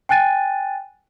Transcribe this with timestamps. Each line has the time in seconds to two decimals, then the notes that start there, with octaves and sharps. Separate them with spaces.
0.09 G5 G#5 F#6 A6 D#7